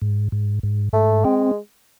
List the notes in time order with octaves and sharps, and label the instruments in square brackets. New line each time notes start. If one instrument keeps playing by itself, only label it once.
[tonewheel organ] G#2
G#2
G#2
[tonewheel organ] G#2 [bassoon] A3
[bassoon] G#3 [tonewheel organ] C4